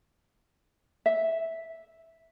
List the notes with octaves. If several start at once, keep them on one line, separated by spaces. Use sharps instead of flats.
E5